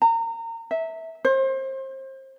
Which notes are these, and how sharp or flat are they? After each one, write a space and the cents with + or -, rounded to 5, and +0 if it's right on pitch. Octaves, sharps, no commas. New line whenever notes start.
A#5 -30
E5 -15
C5 +30